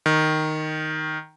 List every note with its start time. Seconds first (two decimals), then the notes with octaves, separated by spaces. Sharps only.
0.06 D#3